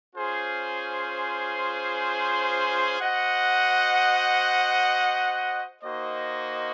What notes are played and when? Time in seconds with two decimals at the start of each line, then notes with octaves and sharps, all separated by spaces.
0.15 C#4 F4 G#4 C5
2.98 F#4 C5 D#5 F#5
5.82 A#3 D#4 F#4 C5 D#5